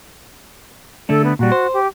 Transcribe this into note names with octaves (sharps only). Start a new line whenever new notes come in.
D3 A3 D4 A4
B3
A#2 G3 F#4
C5
G4